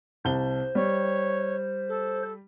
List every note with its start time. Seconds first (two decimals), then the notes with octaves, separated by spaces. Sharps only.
0.25 C2 C5 A5 G7
0.75 G3 C#5
1.89 A4